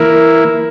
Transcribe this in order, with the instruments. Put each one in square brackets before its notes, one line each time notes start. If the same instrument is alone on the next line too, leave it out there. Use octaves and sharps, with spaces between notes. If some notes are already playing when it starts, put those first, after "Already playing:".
Already playing: [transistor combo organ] E3 A#3 E4 [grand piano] A#4